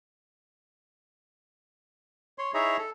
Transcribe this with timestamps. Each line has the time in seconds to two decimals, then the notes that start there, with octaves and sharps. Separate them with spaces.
2.38 C#5 C6
2.54 D#4 E4 G#4 C#5 E5 A#5
2.79 A4